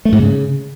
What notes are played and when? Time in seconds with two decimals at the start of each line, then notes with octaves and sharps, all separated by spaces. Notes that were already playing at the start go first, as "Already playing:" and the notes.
0.05 A3
0.12 G#2
0.19 C#3